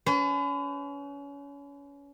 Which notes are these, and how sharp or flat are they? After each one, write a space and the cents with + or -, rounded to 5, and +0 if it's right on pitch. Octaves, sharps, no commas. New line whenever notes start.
C#4 +30 B4 +40